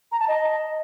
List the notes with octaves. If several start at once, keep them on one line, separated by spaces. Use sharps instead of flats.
A#5
A5
D#5